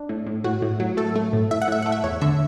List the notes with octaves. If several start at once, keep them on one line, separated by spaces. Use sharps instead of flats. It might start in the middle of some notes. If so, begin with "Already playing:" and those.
Already playing: D4
A2
A2
A2 F#4
A2
F#3
A3 A4
A3
A2
A2 E5
F#5
A2 E5
A3 F#5
E5
E2 C#5
D3 E5